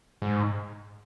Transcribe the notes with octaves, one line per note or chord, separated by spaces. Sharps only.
G#2